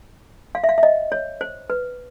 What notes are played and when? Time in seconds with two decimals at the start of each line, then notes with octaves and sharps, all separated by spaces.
0.55 F5
0.64 E5
0.69 F5
0.78 E5
0.83 D#5
1.12 C#5
1.41 C5
1.70 B4